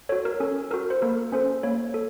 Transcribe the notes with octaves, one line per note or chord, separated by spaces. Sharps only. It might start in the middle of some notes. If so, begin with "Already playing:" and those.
F#4 A4 C#5
A#4
C#4 A4
F#4 A4 A#4
C5
A#3 A#4
C#4 A4 C5
A#3 C#5
A4